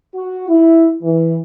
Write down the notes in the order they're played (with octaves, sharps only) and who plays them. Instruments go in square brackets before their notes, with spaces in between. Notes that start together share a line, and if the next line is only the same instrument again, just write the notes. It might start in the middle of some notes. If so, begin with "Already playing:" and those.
[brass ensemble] F#4
E4
E3